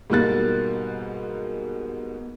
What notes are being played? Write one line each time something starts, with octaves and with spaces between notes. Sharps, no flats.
G#2 B2 G3 A#3 F#6 A6